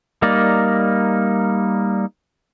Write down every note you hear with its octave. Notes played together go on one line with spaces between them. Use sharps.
G3 A#3 D#4 A#4 D5